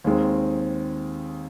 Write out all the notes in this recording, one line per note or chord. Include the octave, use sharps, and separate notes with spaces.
D#2 D#3 G#3 C4